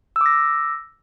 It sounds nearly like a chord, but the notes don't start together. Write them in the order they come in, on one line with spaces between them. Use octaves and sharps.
E6 D6 A#6